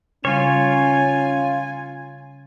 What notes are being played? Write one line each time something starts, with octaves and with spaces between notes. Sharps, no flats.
C#3 G3 C#4 F4 C#5 G#5